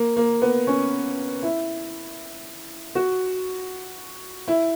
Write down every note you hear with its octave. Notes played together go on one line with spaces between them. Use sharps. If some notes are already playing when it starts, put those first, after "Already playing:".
Already playing: A#3
A#3
B3
C#4
E4
F#4
E4